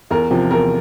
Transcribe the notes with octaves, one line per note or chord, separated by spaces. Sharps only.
E2 A#4
C3 F3
E2 A#4